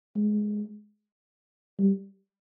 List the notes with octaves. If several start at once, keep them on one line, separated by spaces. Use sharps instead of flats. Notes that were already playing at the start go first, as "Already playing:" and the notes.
G#3
G3